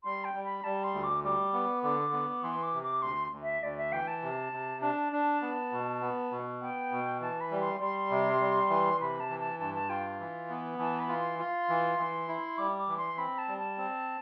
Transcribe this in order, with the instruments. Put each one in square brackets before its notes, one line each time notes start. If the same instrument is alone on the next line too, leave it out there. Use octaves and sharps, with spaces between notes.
[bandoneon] G3 [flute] C6
[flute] G5
[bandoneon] G3
[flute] B5
[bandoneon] G3 [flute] A5
[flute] C6
[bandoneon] D2
[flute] D6
[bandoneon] G3 [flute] D6
[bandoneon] B3
[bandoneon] D3 [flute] D6
[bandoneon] B3
[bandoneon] E3 [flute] C6
[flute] D6
[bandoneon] C3
[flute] D6
[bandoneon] D2 [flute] C6
[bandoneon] D2
[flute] E5
[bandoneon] D2 [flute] D5
[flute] E5
[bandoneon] E3 [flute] G5
[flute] A5
[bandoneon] C3
C3
[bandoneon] D4 [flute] A5
[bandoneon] D4
B3
B2
B3
B2
[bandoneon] B3 [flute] G5
[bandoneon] B2
[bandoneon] E3 [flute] A5
[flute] B5
[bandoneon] G3
[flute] C6
[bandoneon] G3 [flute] C6
[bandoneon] C3
G3
E3
[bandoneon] C3 [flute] B5
[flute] A5
[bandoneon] E3
[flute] A5
[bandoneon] G2 [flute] A5
[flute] A5
[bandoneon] F4 [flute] G5
[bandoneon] E3
B3
[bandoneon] E3 [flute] A5
[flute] B5
[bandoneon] F4
[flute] C6
[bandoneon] F4
E3
E3
E4
[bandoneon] G3 [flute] D6
[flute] D6
[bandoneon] E3
[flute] C6
[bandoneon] C4 [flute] B5
[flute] A5
[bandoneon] G3
[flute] A5
[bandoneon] C4